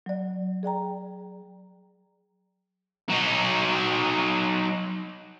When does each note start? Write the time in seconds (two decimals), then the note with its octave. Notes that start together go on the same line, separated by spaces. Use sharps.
0.06 F#3 D5
0.63 G#4 D5 G5 A#5
3.10 F#3 D#4